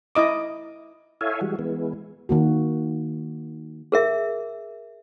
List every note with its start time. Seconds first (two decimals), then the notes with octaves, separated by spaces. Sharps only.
0.15 E4 D#5 D6
1.21 E4 A4 C#5 E5 F5 G#5
1.41 E3 G3 G#3 F#4
1.59 E3 G#3 B3
2.29 D#3 A#3 F#4
3.92 G#4 A#4 E5